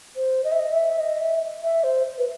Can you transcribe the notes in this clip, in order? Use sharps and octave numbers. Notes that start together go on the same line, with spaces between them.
C5
D#5
E5
D#5
E5
D#5
E5
E5
C5
B4